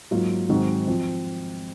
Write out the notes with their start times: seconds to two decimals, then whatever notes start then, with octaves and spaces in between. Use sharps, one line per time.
0.11 G#2 F#3 A#3 F4
0.49 G#2 D#3 F#3 C4 F#4
0.88 F3 C4